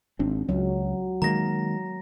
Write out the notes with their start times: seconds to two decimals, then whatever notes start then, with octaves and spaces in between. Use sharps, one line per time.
0.19 G#1 C4 D4
0.49 C#2 F#3
1.22 D#3 G#3 A#3 A#5 A#6